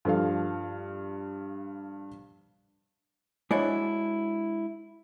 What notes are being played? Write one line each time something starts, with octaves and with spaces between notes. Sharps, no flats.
G2 F3 A4 F5
G#3 D4 E4 F#4 C5 C#5